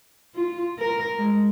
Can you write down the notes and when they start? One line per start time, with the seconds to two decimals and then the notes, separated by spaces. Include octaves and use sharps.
0.35 F4
0.79 A#4
1.19 G#3